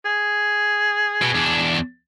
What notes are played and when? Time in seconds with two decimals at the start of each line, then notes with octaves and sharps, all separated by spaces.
0.05 G#4
1.22 B2
1.35 E2 D4